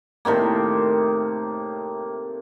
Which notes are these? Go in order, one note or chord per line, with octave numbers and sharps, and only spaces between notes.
A2 C3 D#3 A#3